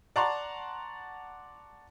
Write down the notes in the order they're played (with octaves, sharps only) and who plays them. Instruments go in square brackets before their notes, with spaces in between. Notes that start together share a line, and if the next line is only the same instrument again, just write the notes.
[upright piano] D5 F#5 A5 A#5 C6 C#6